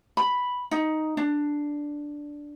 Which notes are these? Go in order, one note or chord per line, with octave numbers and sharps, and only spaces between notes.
B5
D#4
D4